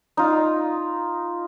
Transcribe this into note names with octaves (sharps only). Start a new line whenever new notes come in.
D#4 F4